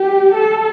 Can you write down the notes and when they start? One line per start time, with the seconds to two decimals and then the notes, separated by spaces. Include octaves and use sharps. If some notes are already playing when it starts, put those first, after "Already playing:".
Already playing: G4
0.34 A4